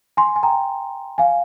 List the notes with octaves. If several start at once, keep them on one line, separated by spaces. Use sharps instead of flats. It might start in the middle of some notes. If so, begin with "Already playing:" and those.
G#5 C6
G#5
G5 A#5
F5 G#5